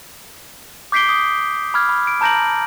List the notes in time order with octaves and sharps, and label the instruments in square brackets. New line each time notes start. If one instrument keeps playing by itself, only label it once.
[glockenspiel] D6 G6 B6 C7 D7 G7
D#6
B5 D6 F6 G#6
B5
D7
A5 A#5 G6 A#6 D7 F#7